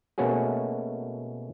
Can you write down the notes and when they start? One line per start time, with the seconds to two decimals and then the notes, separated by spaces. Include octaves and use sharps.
0.18 B2 A3 A#3 C#4 F#4 G#4